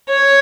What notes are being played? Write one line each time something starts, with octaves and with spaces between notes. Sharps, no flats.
C#5